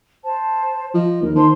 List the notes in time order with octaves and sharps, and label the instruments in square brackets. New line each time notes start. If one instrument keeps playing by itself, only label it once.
[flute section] C5 A5
[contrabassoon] F3 [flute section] D#5
[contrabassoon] D#2 [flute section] A#4
[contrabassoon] D#3 [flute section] C5 A5 C6